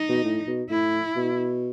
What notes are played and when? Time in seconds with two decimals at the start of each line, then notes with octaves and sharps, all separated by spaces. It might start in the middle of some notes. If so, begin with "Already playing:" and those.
Already playing: D#4
0.09 B2
0.24 A2
0.47 B2
0.70 A2 E4
1.16 B2